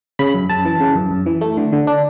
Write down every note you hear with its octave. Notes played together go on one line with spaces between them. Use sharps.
C#3 B5
F#2
F#2 A5
E3
C#3
F#2
F#2
E3
A3
D3
D3
D4